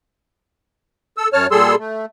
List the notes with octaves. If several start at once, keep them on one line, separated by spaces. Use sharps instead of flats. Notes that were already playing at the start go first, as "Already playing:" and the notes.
A4 E6
F#2 C#5 A5 F6
A#2 G3 G#4 A4 C6 E6
A3